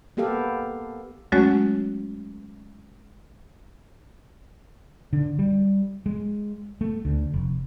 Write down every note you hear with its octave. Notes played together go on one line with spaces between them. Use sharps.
A#3 B3 G4 A4 F5
F#3 G#3 A3 C#4 F#4 C#5
D3
G3
G#3
A3
D2
F1